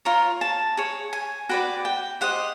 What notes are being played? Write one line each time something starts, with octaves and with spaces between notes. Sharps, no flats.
F4 A#4 C#5 A#5
A5
G#4 C#5
G#5
F#4 B4 D5 G5
G5
G4 C5 D#5 F#5